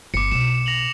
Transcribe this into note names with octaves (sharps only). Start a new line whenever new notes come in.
G1 D6 C#7
B1 B2 E7
A#6 F7 F#7